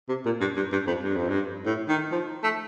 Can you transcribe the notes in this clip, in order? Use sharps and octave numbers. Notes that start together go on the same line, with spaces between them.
C3
A#2
G2
G2
G2
F2
G2
F2
G2
A2
D#3
F3
A3